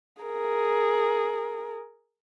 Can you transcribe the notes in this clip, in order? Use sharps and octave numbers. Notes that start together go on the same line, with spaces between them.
G#4 A#4